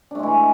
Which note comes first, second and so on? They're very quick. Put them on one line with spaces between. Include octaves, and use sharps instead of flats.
D4 A3 G#3 E3